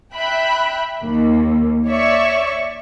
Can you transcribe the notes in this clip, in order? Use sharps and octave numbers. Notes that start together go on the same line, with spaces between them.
E5 G5 B5 F#6
D#2 A#3
C#5 D5 E5 C#6